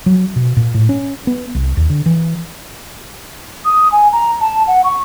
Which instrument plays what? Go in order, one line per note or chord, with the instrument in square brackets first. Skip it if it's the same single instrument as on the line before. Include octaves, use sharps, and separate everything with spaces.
[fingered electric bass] F#3
B2
A#2
A2
C#4
B3
C2
D#2
D3
E3
[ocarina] D#6
G#5
A#5
A5
F#5
C#6